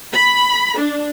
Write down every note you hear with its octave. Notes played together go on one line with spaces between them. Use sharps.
B5
D4